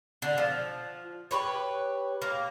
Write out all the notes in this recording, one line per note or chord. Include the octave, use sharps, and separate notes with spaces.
D3
F3
G4 B4 C#5
A#3